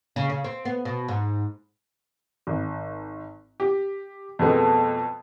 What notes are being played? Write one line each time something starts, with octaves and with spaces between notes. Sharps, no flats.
C#3
C#3
C4
B3
B2
G#2
G#1
G4
F2 B2 G#3 A3 B3